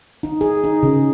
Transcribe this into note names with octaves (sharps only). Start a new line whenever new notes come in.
D#4
G#4
D#4
C#3